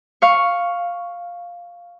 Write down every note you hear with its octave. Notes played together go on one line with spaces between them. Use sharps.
F5 C#6